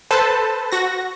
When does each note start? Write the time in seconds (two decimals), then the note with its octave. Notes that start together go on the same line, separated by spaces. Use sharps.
0.11 A4 B4 C5 A5
0.72 F#4 A#6